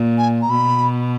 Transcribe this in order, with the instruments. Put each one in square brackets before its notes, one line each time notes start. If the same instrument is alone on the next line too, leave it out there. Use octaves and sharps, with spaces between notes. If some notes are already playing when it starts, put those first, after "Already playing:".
Already playing: [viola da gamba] A#2
[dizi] G#5
A#5
[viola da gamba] B2 [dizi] B5